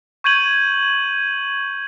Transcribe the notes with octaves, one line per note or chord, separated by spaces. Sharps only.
C#6 G6 G#6 D#7 F#7